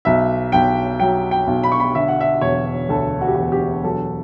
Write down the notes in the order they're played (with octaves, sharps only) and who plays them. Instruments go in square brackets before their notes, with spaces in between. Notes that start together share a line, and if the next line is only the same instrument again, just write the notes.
[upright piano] B1 E5
B1 G5
F#3 G5
G5
B1
B5
C#6
B5
D3 E5
F#5
E5
E1 C#5
D2 A4
F#4
G4
E1 F#4
G4
F#3 A4